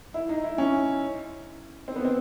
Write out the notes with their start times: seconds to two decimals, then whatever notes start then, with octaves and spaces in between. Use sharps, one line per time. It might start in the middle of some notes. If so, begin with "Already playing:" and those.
0.14 E4
0.29 D#4
0.44 E4
0.58 C#4
1.88 C4
1.96 B3
2.05 C4